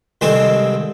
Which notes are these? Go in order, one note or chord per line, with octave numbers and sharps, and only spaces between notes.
C2 D#3 G#3 C4 A4 G#5